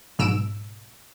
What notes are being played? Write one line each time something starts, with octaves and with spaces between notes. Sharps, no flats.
B1 G#2 B2 E6 D7 E7